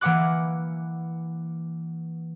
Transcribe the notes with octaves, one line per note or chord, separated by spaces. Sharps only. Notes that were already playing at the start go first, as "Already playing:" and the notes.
E3 A#3 B4 F#5 D6 F#6